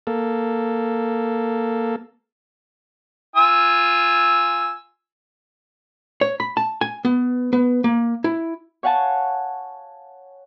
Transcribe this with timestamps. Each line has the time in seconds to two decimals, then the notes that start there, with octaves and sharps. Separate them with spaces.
0.07 A#3 A4
3.36 F4 G#5 E6
6.21 C#5
6.40 B5
6.57 A5
6.81 G#5
7.05 B3
7.53 B3
7.84 A#3
8.24 E4
8.83 C#5 F5 F#5 G#5 A5